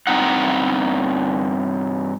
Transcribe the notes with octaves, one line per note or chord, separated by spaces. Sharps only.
G2 F3 C4 D#4 F#5